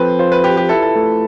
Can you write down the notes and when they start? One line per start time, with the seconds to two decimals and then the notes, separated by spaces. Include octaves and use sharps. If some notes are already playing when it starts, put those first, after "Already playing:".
Already playing: F3 C4 A4 B4 C5
0.19 F4 C5
0.32 B4
0.44 G4 B4
0.57 G4
0.69 E4 A4
0.82 A4
0.96 A3